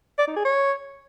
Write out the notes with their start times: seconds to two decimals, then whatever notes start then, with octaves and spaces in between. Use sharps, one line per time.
0.18 D5
0.27 D#4
0.36 G#4
0.45 C#5